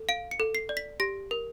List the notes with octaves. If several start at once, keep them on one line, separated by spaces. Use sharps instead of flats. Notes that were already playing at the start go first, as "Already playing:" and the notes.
Already playing: A4
F5 D7
C#7
A4
C7
D5
B6
G4 A#6
A#4